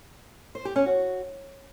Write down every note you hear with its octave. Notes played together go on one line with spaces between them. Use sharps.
C5
G4
C#4
F#4